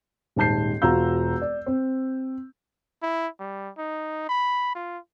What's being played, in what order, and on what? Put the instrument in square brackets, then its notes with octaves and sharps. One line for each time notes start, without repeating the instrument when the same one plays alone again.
[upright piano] D#1 G#2 A5 G6 C7
E1 F4 F#4 A#5 E6 G6
D5
C4
[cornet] E4
G3
D#4
B5
F4